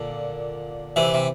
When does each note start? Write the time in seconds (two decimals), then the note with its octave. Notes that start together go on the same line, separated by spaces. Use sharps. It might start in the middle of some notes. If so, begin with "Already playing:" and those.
Already playing: A#2 D3
0.96 C3 E3
1.14 C3